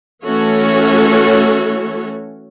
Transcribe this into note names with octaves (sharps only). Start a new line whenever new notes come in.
E3 A3 C#4 F#4 A4 C#5